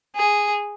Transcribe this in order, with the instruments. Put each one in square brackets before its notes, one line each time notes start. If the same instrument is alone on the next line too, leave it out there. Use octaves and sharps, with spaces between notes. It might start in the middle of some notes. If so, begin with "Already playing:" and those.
[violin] G#4